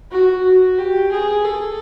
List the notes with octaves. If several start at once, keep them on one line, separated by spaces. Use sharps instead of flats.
F#4
F#4
G4
G#4
A4